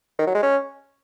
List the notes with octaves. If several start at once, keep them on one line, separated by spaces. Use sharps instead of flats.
D#3
F#3
G#3
C#4